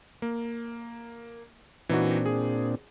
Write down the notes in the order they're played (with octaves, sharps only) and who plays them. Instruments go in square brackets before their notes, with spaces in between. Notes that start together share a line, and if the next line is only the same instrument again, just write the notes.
[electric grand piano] A#3
[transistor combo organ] A#2 C4 D4 [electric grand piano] E3 D#4 F#4
[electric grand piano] G#4